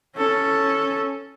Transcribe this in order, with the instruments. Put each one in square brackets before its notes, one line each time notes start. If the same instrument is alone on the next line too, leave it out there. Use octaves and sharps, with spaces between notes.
[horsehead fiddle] C#4 A4